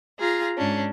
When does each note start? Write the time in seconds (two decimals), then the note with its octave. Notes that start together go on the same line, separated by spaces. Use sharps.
0.20 F4 G#4 A#5
0.57 G#2 C#4 D4